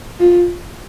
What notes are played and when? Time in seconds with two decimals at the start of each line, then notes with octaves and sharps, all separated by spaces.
0.20 F4